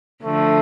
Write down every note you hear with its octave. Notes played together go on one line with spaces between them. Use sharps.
D3 F3 A3